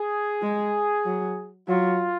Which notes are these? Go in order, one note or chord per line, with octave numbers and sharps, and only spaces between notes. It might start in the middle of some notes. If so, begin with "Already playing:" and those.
Already playing: G#4
G#3
F#3
F#3 F4